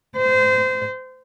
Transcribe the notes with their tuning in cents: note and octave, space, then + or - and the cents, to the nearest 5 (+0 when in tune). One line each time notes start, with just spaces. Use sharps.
C5 -25